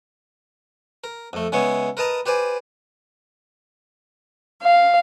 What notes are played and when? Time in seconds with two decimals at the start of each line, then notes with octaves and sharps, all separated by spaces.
1.04 A#4
1.33 F2 A3
1.52 C#3 G#3 B3 E4 C#5
1.97 A#4 B4 D#5 A5 A#5
2.26 G4 B4 C5 D5 G#5
4.62 F5